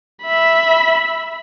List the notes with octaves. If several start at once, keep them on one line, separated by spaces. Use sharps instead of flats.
E5 B5